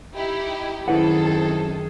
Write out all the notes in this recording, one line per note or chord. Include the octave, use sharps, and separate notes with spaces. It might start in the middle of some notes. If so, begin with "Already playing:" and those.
D#4 E4 G4
F#2 D#3 C4 E4 G#4 A4 B4 F#5